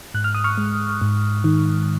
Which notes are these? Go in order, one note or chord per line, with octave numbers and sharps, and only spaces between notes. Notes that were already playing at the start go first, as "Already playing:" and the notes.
G#2 F#6
F6
D#6
C#6 F6
G#3
G#2
D#3